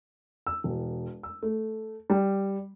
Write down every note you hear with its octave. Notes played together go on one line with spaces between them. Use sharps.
E6
E1
E6
A3
G3